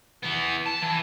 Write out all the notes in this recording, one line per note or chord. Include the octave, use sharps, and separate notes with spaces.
E3 B3
A5
E3